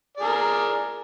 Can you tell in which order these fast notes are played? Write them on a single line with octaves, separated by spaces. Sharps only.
D5 G#4 A#4